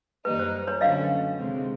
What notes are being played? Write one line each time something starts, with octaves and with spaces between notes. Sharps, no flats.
F#2 D#3 G3 A#3 D#4 B4
C5
B4 C#5
D3 F#3 A3 C#4 F#4 D#5 F5
C3 D#3 G#3 C4